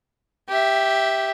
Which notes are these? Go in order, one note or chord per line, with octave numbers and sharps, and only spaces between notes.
G4 E5